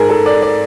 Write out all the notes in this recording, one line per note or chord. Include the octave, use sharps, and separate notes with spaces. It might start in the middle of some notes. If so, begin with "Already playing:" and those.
Already playing: G#2 G#3 G#4 A#4
A4
D5
D5